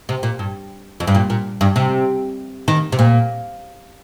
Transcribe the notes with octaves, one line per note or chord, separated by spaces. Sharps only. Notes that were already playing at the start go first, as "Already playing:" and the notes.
C3
A#2
G2
F2
G2
A#2
A#2
G2
C3
D#3
C3
A#2